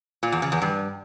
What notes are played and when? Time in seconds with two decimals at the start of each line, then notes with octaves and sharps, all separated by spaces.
0.23 A#2
0.32 E2
0.42 C#3
0.52 E2
0.62 G2